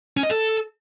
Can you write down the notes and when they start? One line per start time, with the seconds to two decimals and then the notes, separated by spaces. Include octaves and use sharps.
0.17 C#4
0.23 D#5
0.30 A4